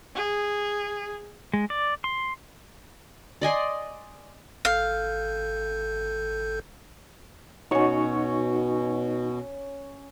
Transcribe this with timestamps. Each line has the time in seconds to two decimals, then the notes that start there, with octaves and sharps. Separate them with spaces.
0.16 G#4
1.54 G#3
1.70 D5
2.04 C6
3.41 D5 D#5 G#5 C6
4.65 G#1 A4 F5 G6
7.71 B2 C#4 D#4 F#4 C#5 C#6